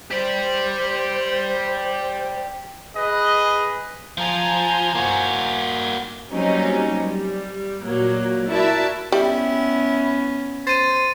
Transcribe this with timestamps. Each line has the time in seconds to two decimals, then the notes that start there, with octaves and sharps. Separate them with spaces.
0.11 G4 C5 D5
2.96 G#4 B4 D#5
4.18 F3 C5 G#5 A#5
4.95 A#3 F#4
6.32 F#3 G3 A#3 C4 C#4 D#4
7.00 G3
7.83 A#2 F#3 A#3
8.49 E4 F#4 A#4 D5 E5 A5
9.12 G3 B3 C#4 E4
10.67 C5 A6 D#7